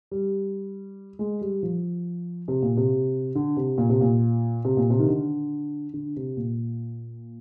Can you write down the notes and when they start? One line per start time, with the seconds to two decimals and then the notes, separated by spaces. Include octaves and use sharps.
0.11 G3
1.19 G#3
1.41 G3
1.63 F3
2.48 C3
2.62 A#2
2.77 C3
3.35 D3
3.57 C3
3.78 A#2
3.89 C3
4.01 A#2
4.65 C3
4.77 A#2
4.90 C3
4.99 D#3
5.08 D3
5.94 D3
6.16 C3
6.37 A#2